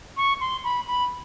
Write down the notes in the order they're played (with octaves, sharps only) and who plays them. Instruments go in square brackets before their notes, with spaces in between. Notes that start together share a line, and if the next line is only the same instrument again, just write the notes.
[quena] C#6
C6
B5
B5